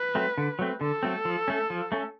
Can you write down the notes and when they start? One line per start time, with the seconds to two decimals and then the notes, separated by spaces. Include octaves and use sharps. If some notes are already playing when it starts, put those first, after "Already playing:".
Already playing: B4
0.15 F#3 A3 C4
0.38 D3
0.59 F#3 A3 C4
0.81 D3 A4
1.03 F#3 A3 C4
1.25 F3
1.48 A3 C#4
1.70 F3
1.92 A3 C#4